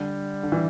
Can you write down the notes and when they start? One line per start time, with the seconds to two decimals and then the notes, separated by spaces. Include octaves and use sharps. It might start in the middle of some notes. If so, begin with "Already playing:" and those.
Already playing: D3 G3
0.43 D3
0.52 E3